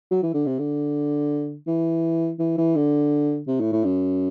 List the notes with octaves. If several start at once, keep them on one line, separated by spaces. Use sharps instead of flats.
F#3
E3
D3
C3
D3
E3
E3
E3
D3
C3
A2
A2
F#2